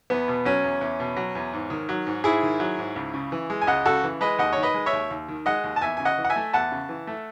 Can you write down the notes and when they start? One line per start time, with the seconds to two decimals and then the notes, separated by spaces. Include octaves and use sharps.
0.10 E2 B3
0.28 B2
0.45 F#3 C#4
0.64 E2
0.81 E2
1.00 B2
1.16 F#3
1.35 E2
1.53 G#2
1.70 D#3
1.89 F#3
2.07 G#2
2.24 G#2 E4 G#4
2.43 D#3
2.60 F#3
2.78 G#2
2.96 C#2
3.14 C#3
3.32 E3
3.50 G#3
3.61 G#5
3.67 C#2 D#5 F#5
3.85 C#3 F#4 A4
4.04 E3
4.21 G#3 B4 D#5
4.38 D#2 D#5 F#5
4.53 D#3 C#5
4.63 B4 D#5
4.74 G#3
4.86 C#5 E5
4.93 D#2
5.11 D#2
5.28 D#3
5.46 G#3 D#5 F#5
5.64 D#2
5.76 A5
5.81 E2 E5 G#5
5.97 C#3 G#5
6.05 D#5 F#5
6.18 E3
6.24 F#5
6.30 E5 G#5
6.36 A3
6.54 E2 F#5 A5
6.72 C#3
6.89 E3
7.07 A3